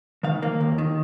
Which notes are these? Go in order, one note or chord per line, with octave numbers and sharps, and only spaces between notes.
D#3 F5
A#3
D#2
D#3